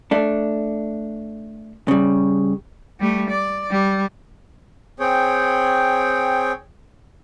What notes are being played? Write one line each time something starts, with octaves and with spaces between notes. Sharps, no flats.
A3 D4
C#3 G3
G3 A3
D5
G3
C4 G#4 C#5 G5